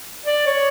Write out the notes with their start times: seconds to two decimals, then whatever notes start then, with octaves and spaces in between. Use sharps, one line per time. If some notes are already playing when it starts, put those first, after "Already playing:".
0.25 D5
0.46 C#5